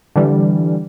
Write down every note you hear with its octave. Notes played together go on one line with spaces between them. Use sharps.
D3 E3 G3